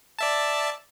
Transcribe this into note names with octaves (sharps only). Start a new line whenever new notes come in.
D5 E5 A5